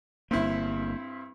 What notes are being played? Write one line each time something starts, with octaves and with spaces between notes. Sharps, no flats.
G1 G2 A#3 C4 E4